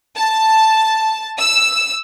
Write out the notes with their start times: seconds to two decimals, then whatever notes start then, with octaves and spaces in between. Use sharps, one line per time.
0.16 A5
1.39 E6